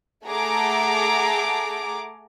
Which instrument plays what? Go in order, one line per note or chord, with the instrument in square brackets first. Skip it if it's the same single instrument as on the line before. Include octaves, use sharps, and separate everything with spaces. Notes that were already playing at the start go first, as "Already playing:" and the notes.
[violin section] A3 G#4 A4 F#5 A#5 D6